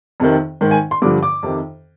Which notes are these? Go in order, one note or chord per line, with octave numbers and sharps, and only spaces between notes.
F2 C3 D#3
G#2 D#3
G#5
C6
G2 D3 F3 D6
D6
F2 C3 D#3